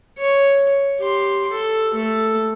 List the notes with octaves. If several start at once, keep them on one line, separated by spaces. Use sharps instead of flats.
C#5
G4 C6
A4
A3 A4